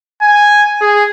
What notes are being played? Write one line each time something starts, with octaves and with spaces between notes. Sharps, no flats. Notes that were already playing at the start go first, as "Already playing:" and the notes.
G#5
G#4